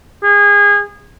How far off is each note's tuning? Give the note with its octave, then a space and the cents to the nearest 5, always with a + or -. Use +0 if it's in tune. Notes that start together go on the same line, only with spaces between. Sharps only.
G#4 -25